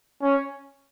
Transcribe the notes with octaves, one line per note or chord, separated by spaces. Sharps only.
C#4